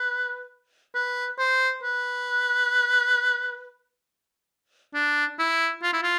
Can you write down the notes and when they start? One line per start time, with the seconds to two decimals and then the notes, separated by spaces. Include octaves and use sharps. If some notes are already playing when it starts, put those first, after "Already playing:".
Already playing: B4
0.95 B4
1.39 C5
1.83 B4
4.94 D4
5.39 E4
5.83 F4
5.93 E4
6.03 F4